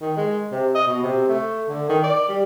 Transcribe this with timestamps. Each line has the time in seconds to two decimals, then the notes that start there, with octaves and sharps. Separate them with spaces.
0.01 D#3
0.17 G#3
0.52 C3
0.75 D#5
0.88 B2
1.03 C3
1.28 A3
1.69 D3
1.89 D#3
2.04 D5
2.29 G3